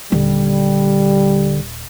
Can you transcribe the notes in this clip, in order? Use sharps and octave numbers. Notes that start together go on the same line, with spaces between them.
D#1 D3 G3